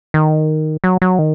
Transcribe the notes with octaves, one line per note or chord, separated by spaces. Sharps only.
D#3
F#3
F#3
D#3